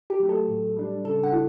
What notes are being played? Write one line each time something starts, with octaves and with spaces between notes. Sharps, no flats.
G4
F#3 A3
A4
A2
G3 D4
C#3 A4
F#5
E4